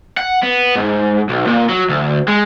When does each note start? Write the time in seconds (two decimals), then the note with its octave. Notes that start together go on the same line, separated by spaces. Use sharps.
0.17 F#5
0.43 B3
0.75 G#2
1.29 B1
1.47 A#2
1.69 F#3
1.90 D2
2.28 G#3